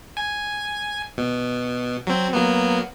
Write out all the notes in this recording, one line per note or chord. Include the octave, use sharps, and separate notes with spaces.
G#5
B2
F#3 C4
F#3 A#3 B3